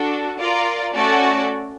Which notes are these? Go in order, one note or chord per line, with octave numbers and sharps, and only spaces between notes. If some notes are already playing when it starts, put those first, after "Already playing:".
Already playing: D4 F#4 A4
F4 A#4 D5
A3 C#4 F#4 A4 D5